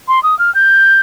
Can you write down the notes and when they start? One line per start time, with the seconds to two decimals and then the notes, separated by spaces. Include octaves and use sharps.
0.08 C6
0.23 D#6
0.39 F6
0.55 G6